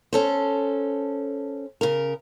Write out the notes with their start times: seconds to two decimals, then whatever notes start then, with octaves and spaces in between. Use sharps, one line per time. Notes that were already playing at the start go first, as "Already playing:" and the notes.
0.13 C#4 A4 C5
1.81 C#3 A#4